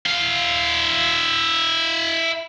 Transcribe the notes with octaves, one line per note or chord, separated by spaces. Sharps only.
E4 F5